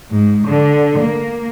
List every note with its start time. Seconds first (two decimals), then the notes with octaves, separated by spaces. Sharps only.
0.11 G#2
0.48 D3
0.99 A#3